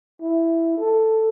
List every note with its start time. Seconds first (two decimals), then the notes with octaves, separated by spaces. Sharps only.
0.22 E4
0.79 A4